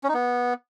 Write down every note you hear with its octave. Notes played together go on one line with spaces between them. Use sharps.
C#4
D#4
B3